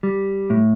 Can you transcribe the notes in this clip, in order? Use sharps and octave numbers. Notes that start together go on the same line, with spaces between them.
G3
A2